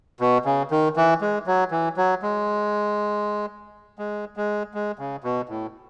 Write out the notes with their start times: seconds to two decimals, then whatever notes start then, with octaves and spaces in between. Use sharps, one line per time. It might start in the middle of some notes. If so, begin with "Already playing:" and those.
0.20 B2
0.45 C#3
0.71 D#3
0.96 E3
1.21 G#3
1.47 F#3
1.71 E3
1.97 F#3
2.22 G#3
3.98 G#3
4.37 G#3
4.74 G#3
4.99 C#3
5.24 B2
5.49 A2